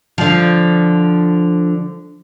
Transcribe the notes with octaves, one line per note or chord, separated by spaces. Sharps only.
D3 F3